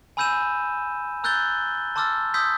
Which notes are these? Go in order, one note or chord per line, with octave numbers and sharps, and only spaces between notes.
G#5 B5 E6 G6 D#7 E7
A#5 E6 F#6 G6 A6 G7
A5 C6 D6 E6 F6 A6
C6 D#6 E6 G6 B6